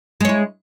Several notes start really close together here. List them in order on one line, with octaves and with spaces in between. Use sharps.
G#3 C#5 E4